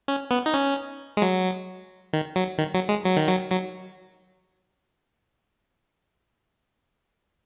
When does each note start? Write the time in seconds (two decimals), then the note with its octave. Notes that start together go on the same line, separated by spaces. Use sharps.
0.08 C#4
0.31 B3
0.46 D#4
0.54 C#4
1.17 G#3
1.22 F#3
2.13 D#3
2.36 F#3
2.58 D#3
2.74 F#3
2.89 G#3
3.04 F#3
3.17 D#3
3.29 F#3
3.50 F#3